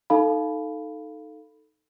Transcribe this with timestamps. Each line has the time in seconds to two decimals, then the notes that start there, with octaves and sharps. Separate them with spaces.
0.10 D#4 A4 F5 B5